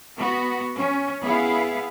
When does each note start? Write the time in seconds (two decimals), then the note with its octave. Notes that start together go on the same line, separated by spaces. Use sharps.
0.17 B3 F#4
0.76 C#4
1.22 B3 E4 G#4 F5